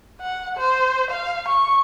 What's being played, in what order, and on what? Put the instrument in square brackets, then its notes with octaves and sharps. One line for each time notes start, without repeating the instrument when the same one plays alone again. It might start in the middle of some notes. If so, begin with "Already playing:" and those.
[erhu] F#5
C5
F5
C#6